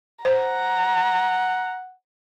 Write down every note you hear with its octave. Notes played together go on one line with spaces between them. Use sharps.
C5 F#5 A#5